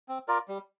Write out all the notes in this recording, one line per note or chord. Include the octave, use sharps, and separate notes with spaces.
C4
F4 A#4 D5
G3